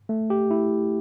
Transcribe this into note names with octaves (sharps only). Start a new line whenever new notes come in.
A3
G4
E4